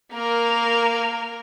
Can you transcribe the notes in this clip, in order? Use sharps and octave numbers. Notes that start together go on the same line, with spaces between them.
A#3 A#4